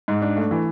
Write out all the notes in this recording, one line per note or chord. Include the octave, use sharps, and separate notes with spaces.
G#2
D4
A3
E3